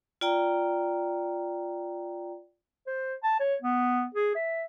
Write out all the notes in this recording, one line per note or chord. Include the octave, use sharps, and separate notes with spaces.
F4 D5 G5 A#5
C5
A5
C#5
B3
G#4
E5